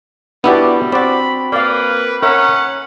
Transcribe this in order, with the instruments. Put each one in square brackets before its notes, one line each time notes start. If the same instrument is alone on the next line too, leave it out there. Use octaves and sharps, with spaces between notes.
[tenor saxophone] G3 [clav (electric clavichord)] B3 E4 G4 [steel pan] D4 F#4 D5
[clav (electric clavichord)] C4 F#4 [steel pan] D5 [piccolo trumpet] B5
[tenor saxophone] A#3 [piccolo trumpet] B4 [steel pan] D5 F5
[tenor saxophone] C#4 [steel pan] A#4 E5 [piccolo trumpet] F#5